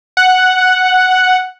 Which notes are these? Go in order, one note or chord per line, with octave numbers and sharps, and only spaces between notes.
F#5